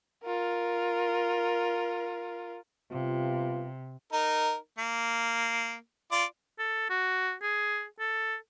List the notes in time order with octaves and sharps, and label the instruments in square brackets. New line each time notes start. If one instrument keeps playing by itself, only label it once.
[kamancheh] F4 A#4
[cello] C3 [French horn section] G3 B3 F4
[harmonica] D#4 A#4
A#3
F4 D5
[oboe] A4
F#4
G#4
A4